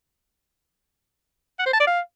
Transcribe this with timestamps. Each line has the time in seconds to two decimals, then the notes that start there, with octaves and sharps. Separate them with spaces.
1.59 F#5
1.66 C5
1.73 A5
1.80 D5
1.87 F5